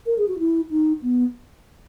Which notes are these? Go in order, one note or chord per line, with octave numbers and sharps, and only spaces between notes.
A#4
G#4
F#4
E4
D#4
B3